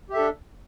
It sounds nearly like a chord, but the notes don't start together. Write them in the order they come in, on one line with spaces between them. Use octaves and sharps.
G4 E5 A4 D4